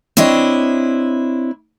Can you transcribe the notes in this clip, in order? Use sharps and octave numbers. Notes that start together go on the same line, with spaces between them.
C4 D4 E4 C#5 D#5